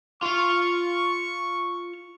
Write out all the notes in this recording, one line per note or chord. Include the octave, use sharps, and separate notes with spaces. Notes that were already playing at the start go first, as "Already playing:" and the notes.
F4 F5 C#6